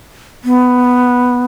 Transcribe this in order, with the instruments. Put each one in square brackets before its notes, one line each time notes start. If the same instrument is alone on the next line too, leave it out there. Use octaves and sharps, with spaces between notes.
[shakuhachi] B3